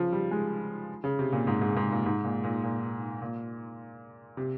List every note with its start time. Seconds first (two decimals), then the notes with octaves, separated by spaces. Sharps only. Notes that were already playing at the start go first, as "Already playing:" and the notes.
Already playing: C#3 F3
0.12 G3
0.31 G#3
1.04 C#3
1.19 C3
1.32 A#2
1.47 G#2
1.62 G#2
1.77 G#2
1.91 A#2
2.06 G#2
2.24 A#2
2.44 A#2
2.63 A#2
3.22 A#2
4.37 C3